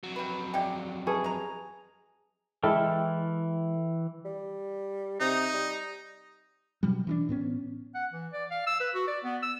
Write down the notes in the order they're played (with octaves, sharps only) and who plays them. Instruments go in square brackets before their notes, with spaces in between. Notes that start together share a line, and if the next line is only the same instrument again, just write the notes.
[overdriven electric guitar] F2 F#3
[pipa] G3 B4
[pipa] G#3 G4 [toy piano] D5 F5 G5
[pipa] E4 [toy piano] G4 B4 A5 [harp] G#4
[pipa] G#3 A#5
[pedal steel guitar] E3 G5 F6 [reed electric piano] G#3 E4 A4
[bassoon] G3
[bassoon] C3 [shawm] D#4
[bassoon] G3
[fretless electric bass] B2 F#3 G3
E3 C#4 D4
A2 B3 C#4
[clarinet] F#5
E3
D5
F5
E6
B4
F#4
D5
B3
E6